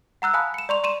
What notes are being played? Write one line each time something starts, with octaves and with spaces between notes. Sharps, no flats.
F#5 A#5 E6 F#6
F5 G#5 A5 B5 D#6 F#6
C#7 E7
D5 A#5 C6 C#6 F7
C6 D#7 E7